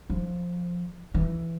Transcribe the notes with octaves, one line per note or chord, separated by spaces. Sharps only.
F3
E3